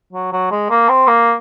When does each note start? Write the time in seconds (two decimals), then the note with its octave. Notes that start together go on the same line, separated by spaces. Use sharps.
0.13 F#3
0.32 F#3
0.51 G#3
0.70 A#3
0.89 C4
1.07 A#3